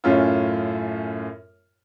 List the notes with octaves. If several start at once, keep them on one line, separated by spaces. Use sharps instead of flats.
F#2 A2 C#4 F4